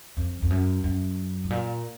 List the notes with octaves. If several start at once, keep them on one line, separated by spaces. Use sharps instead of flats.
F2
F2
F#2
F#2
G#2
A#2